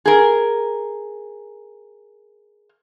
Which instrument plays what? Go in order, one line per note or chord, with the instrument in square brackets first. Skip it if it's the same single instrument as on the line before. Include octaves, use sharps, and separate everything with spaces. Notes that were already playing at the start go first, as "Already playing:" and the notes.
[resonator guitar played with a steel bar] G#4 A#4